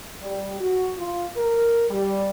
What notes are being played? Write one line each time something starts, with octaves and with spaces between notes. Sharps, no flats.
G3
F#4
F4
A#4
G3